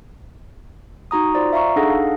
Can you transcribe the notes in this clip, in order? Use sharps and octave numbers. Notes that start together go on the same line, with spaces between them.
D#4 F#4 A#5 D#6
F4 C5 D5
E5 F5 A#5 C#6
D4 D#4 G#4 A4 F#5 A#6
F5